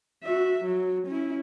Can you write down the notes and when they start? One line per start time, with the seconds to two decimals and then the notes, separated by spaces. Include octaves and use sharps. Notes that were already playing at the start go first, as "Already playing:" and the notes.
0.24 F#4 E5
0.64 F#3
1.07 C#4 E4